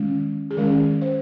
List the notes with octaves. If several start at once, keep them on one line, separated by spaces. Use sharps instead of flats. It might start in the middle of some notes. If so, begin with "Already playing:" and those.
Already playing: D#3 G#3 C#4
G#4
D#3 G#3 C#4 A#4
C5